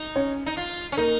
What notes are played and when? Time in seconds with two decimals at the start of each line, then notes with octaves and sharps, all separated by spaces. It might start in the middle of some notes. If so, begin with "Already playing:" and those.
Already playing: D#4
0.16 C#4 C#5
0.46 D#4
0.57 F4
0.92 C#4
0.97 A#3 D#4 A#4